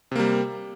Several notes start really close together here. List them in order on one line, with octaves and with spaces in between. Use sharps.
C3 A#3 G3